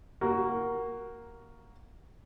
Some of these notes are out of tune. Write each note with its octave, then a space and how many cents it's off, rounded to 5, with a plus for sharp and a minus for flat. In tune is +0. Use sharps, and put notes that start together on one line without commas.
A#3 +0 F#4 +10